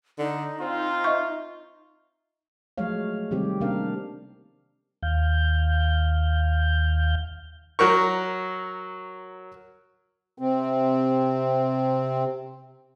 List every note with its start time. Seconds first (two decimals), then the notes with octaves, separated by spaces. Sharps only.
0.19 D3 D#4
0.61 C4 F4
1.04 D#5 E5 C#6
2.78 F3 F#3 G#3 A3 C#5 F5
3.31 C3 D#3 G3 C4 G4
3.60 C3 A#3 C#4 D4 A#4 F5
5.03 D#2 F5 G6
7.79 F#3 A#4 C#6
10.38 C3 C4